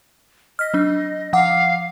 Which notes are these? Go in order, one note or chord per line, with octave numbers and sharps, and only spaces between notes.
D#5 F6 B6
F#3 D4
F3 F5 F#5 D6